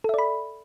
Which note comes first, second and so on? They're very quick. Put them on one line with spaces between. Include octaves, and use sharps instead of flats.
A4 E5 D5 B5